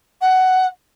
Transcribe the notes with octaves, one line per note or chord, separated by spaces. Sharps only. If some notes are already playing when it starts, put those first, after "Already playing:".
F#5